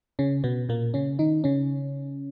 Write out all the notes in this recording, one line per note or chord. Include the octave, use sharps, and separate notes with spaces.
C#3 C#4
B2 B3
A#2 A#3
C#3 C#4
D#3 D#4
C#3 C#4